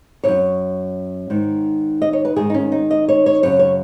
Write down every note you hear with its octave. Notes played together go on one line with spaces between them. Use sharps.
F#2 C#3 C#5
G#2 D#3
D#5
C#5
B4
G#2 D#3 G#4
D#4
C#4
D#4
D#5
C#5
C#5
F#2 C#3 C#5
C#5